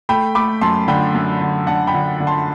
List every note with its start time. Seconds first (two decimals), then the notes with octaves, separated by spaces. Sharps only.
0.09 A3 G5 B5
0.35 A3 B5 D6
0.61 F#2 A5 C6
0.88 D3 G5 B5
1.15 F#2
1.41 D3
1.67 D3 F#5 A5
1.87 G5 B5
1.94 D3
2.20 D3
2.27 A5 C6